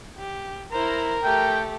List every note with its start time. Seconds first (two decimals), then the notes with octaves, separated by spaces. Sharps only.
0.18 G4
0.72 E4 A#4 C5 A#5
1.23 A3 G4 G5